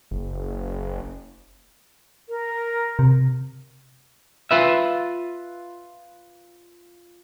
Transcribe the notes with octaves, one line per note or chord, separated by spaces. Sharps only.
F#1
A#4
C3
F4 B4 E5